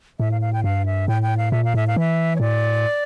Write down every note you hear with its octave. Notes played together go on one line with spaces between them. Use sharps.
A2 E5
F5
F5
G5
G2 F5
E5
A2 G5
G5
F5
A#2 E5
F5
A2 E5
F5
E3 E5
C#5
A2 D5